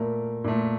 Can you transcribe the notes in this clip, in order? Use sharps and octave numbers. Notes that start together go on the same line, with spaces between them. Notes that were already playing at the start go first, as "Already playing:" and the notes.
Already playing: A#2 A3 A#4
A#2 A3